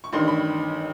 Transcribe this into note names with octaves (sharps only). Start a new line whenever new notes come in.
C#6
A1 G2 D#3 C6
B5